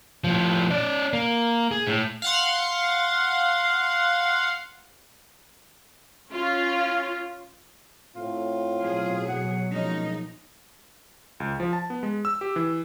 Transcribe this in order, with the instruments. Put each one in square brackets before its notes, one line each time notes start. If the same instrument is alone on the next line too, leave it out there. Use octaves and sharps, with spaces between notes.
[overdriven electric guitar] A2 F3
C#4 D5
A#3
G#4
A2
[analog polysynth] F5 F#5 C6
[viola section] C#4 F4
[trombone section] A2 C4 [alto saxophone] F4
[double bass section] B2 F#3 [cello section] G#4
[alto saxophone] F#5
[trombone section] A2 G#3 A#3 [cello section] F3 D#4 [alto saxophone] C#4
[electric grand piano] C#2
F3
A5
B3
G#3
E6
G4
E3